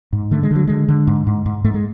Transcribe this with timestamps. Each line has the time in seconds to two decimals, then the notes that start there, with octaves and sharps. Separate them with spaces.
0.13 G#2
0.31 D3 A3
0.43 G#3
0.51 D3 F#3
0.67 D3 G#3
0.89 D3
1.07 G#2
1.27 G#2
1.46 G#2
1.64 G#2 A3
1.74 G#3